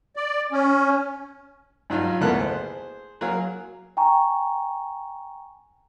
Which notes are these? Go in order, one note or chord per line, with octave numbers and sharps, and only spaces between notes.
D5
C#4
G2 F#3 D#4 F4
A1 D2 A#3 B3 A4 F#6
G#4 C5
F#3 A#3 G#4 A#4 F5
G5 G#5 A#5 C#6